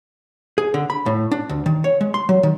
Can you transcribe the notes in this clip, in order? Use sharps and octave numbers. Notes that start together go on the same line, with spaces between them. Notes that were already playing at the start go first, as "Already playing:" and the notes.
G#4
D3
B5
A2
D4
D2
D#3
C#5
G#3
C6
F#3
D#3